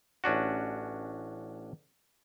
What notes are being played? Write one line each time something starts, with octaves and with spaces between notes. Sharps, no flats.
A1 C#4 D4 F#4